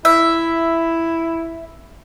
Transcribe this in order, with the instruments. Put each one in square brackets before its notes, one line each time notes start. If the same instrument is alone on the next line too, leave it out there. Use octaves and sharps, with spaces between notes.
[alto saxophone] E4 [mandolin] E5